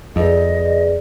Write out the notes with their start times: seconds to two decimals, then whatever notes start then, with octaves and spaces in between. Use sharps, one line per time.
0.16 F2 G#4 B4 D5 D#5